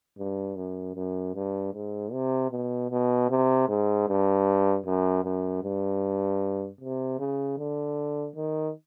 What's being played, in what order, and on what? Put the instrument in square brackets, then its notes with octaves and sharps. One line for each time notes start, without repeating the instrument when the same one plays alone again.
[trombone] G2
F#2
F#2
G2
G#2
C3
B2
B2
C3
G#2
G2
F#2
F#2
G2
C3
C#3
D3
D#3